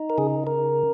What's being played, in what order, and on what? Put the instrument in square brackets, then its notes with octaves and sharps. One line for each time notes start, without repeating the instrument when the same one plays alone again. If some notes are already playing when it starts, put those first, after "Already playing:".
Already playing: [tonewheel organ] D#4
A#4
C#3 G#4
A#4